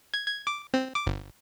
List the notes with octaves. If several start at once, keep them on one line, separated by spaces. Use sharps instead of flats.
G#6
G#6
D6
C4
D6
G1